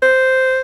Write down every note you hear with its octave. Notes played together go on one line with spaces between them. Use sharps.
C5